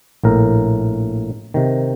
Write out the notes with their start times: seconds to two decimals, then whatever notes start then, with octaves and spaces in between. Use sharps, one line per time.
0.24 A#1 A2 A#4
1.54 C3 D#3